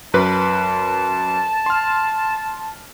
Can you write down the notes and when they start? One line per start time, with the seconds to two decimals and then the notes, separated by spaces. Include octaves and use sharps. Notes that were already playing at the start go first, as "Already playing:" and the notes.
0.14 F#2 B4 A5
1.66 C6 F6